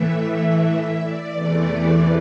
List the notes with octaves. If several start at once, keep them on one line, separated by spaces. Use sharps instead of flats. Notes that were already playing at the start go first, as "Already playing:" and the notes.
Already playing: A2 E3 A3 E5
E5
D5
E2 C3 E3 A3